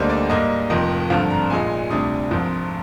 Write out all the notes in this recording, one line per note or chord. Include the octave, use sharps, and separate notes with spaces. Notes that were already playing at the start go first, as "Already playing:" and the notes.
Already playing: D2 D3 G3 A#3 D#4 C5
D5
G#2 G3 A#3 D#4 D#5
F1 F2 D#3 D#5
G#1 G2 D3 F3 C4 F5
A#5
A#1 A#2 G#3 D#4 G#5
D2 C3 G3 D4 D#6
G#1 G#2 F3 C4